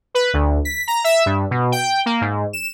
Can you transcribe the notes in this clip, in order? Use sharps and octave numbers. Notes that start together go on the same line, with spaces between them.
B4
D2
B6
A#5
E5
G2
B2
G5
A#3
G#2
E7